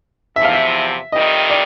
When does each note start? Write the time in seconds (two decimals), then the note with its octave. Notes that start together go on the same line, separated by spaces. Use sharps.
0.36 E2 C3 F3 E5
0.44 F5
0.53 E5
1.12 F2 C3 D#3 G3 D#5
1.50 D5